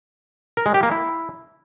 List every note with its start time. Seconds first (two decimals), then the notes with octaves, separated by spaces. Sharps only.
0.57 A#4
0.66 G#3
0.74 G4
0.83 A#3
0.91 E4